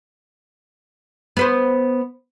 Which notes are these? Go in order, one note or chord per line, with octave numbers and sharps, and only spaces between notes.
B3 B4 C5